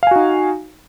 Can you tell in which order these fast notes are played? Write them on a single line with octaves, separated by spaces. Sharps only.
F5 G#5 F#4 D#4